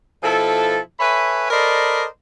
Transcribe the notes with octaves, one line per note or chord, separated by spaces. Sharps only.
B2 F3 E4 A4
A4 B4 C#5 E5 G#5 B5
A4 A#4 C5 D5 D#5 B5